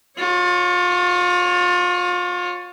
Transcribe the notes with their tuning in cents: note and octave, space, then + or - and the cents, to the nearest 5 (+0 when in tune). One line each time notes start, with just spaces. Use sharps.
F4 +30 C#5 +0